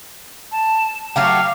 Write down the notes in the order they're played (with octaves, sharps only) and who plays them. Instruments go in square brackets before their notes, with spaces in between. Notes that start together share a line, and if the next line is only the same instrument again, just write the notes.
[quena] A5
[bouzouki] F#3 A3 G4 [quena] F5